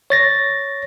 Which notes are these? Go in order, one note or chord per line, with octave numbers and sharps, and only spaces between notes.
C#5 A6 A#6